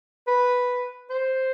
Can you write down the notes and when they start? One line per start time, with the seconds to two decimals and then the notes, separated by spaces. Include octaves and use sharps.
0.27 B4
1.10 C5